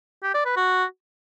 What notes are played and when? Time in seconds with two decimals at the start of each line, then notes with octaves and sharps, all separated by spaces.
0.23 G4
0.34 D5
0.46 B4
0.57 F#4